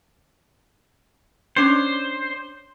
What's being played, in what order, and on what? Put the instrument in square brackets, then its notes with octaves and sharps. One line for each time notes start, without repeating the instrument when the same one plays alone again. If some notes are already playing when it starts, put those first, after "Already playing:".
[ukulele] C#4 D4 C#5 [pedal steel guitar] C5